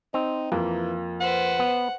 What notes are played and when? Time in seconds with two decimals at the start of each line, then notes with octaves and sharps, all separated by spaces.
0.14 C4 D#4
0.52 F2 E3 A#3
1.21 B4 C5 F#5
1.59 B3